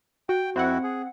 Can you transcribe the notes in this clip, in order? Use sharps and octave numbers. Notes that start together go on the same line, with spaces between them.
F#4 G5
F2 C4 E4 F#4 F#5
G#4